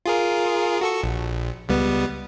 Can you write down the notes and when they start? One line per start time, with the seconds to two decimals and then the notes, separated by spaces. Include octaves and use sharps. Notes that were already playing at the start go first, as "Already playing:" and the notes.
0.06 F4 G#4 A#4
0.81 F#4 A4 C#6
1.04 A#1
1.69 C#2 G3 B3